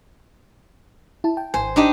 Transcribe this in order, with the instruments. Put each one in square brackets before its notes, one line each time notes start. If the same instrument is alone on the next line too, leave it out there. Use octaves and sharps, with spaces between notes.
[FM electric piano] E4 A5
G5
[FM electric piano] G#1 G#5 [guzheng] C5
[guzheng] D4 D#4 G4